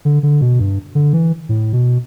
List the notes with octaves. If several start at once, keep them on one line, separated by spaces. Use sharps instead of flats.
D3
D3
B2
G2
D3
E3
A2
B2